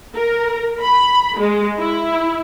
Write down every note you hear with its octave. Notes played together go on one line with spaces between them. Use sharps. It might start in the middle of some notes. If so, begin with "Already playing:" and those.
A#4
B5
G#3
E4